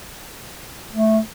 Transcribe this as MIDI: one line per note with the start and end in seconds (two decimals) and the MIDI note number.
0.92 1.19 57